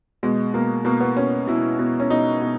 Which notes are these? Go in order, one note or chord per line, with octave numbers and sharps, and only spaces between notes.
B2 G#3
B2 A#3
B2 A#3
B3
B2 C#4
B2 E4
B2
C#4
B2 D#4
B2